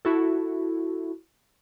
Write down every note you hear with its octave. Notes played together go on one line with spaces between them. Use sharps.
E4 F#4 A4